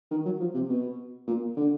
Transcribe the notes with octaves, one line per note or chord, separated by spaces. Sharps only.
D#3
F#3
F3
C3
B2
A#2
D3